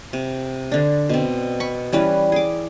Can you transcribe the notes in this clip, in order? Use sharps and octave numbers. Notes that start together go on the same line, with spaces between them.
C3
D3 D4
B2 C4
B5 C#6
E3 G3 C#4 B4
G#4 D6